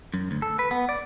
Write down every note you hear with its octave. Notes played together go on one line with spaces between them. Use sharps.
F#2
D2
A4
B4
B3
D5